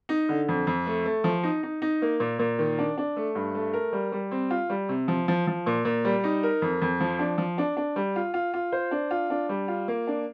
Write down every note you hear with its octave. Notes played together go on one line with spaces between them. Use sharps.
D#4
D3
F2
F2
A3
A3
F3
D#4
D#4
D#4
A#3
A#2
A#2
D#3
D4
D4
A3
G2
A3
A#4
G3
G3
C4
F4
G3
C3
F3
F3
F3
A#2
A#2
G3
D#4
A#4
F2
F2
F3
D4
F3
D4
D4
G3
F4
F4
F4
C5
D4
F4
D4
G3
F4
A#3
D4